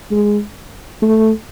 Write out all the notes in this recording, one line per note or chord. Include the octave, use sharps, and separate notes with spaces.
G#3
A3